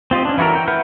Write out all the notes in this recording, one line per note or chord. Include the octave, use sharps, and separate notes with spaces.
C4 F4 G4 D#5
C#4 D4
E3 E4 F#4 A4 A#4
G5
B4 E5 F#5 F6 G6